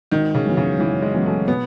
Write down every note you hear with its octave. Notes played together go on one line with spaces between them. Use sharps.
G#1 D#3
C#3
F#2 E3 B3 F#4
C#3
G#1 E3
G#3
F#2 E3 B3 F#4
A3
B2 B3